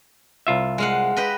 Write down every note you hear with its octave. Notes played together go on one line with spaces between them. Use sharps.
C2 F4 E5
G#3 F5 F#5
G4 B4 D#5